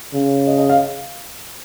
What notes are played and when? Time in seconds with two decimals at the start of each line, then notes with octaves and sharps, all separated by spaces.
0.14 C#3
0.47 D#5
0.58 D#5
0.69 F5